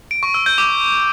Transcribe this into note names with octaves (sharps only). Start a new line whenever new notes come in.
D7
C#6
E6
G6
D6